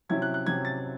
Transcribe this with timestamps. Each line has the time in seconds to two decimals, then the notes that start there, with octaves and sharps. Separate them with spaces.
0.09 C3 F#3 C#4 E4 G#6
0.22 F#6
0.34 F#6
0.47 C3 F#3 C#4 E4 G#6
0.65 A6